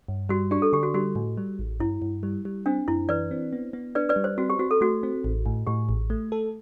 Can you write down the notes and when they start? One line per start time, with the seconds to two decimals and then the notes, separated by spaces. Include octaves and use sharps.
0.08 G2
0.29 G3 F#4
0.51 D4 G4
0.62 A4
0.73 D3 G4
0.83 F#4
0.94 G3 F#4
1.15 A2
1.37 G3
1.59 A1
1.80 G2 E4
2.02 G2
2.23 G3
2.45 G3
2.66 C4 D4
2.88 F#2 E4
3.09 E3 B4 D5
3.31 C4
3.53 B3
3.73 B3
3.95 D4 B4 D5
4.09 B4 D5
4.16 G3
4.24 C5
4.38 C4 F#4
4.50 G4
4.59 C4 F#4
4.71 A4
4.81 A3 F#4
5.03 C4
5.24 A1
5.46 A2
5.67 A2 G4
5.89 A1
6.10 A3
6.32 A4